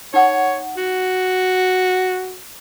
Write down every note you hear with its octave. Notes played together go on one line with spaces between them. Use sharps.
D#4 C#5 F#5 C#6
F#4